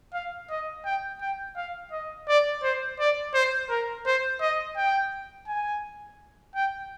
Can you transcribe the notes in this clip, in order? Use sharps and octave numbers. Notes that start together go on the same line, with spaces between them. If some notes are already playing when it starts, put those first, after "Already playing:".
F5
D#5
G5
G5
F5
D#5
D5
C5
D5
C5
A#4
C5
D#5
G5
G#5
G5